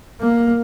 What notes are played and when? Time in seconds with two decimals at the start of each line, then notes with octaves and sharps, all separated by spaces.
0.21 A#3